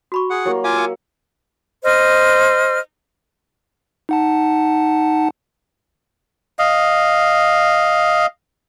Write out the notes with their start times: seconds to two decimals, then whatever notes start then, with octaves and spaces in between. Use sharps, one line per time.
0.12 F#4 B5 C#6
0.30 G#4 F#5
0.45 F#3 A#3 E4 G4
0.64 F4 F5 G#5 D6
0.77 A#4 G5
1.83 C5 D#5 F6
4.09 D#4 F#5 A5
6.59 D#5 F5